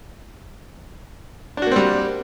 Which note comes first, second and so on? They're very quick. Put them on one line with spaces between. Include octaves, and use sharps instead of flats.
D4 F#4 A#3 C4 G3